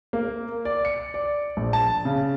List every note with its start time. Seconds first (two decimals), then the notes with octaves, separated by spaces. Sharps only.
0.13 A#3
0.65 D5
0.85 C#7
1.14 D5
1.57 A#1
1.73 A5
2.05 C#3